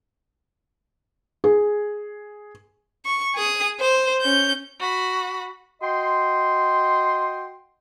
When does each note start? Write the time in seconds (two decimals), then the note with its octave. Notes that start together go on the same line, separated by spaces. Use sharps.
1.44 G#4
3.06 C#6
3.35 G#4 D#6
3.80 C5
4.22 C#4 G6
4.80 F#4 B5
5.82 F#4 D#5 G5 C6